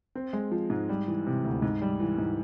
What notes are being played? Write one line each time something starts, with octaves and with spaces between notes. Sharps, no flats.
C4
G#3
F3
G#2
G3
E3
C3
D2
G#2
G3
E3
G#2